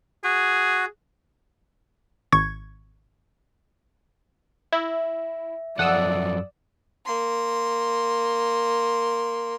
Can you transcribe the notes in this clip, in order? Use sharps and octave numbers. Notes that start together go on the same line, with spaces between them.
F#4 G#4
G#1 C#6 G#6
E4 E5
F#2 F3 A4 D5 F#5 D#6 E6
A#3 C6